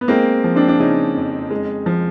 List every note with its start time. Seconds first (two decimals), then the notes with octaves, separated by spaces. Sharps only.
0.01 B3
0.08 G#3 A#3 C4
0.44 F3
0.56 C4 D4
0.68 D4
0.79 C#3 C#4 D#4
1.16 F2
1.51 G#3
1.86 F3